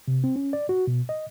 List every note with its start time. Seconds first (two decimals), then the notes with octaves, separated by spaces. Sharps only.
0.08 C3
0.24 C4
0.36 C#4
0.53 D5
0.69 F#4
0.87 B2
1.09 D#5